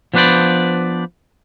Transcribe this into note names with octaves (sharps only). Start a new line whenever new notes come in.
F3 B3 D4 B4 C5 D5